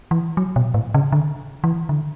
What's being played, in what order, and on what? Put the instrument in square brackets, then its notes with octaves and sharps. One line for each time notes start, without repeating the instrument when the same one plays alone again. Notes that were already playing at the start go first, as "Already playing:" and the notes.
[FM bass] E3
F#3
B2
A2
C#3
D3
E3
D3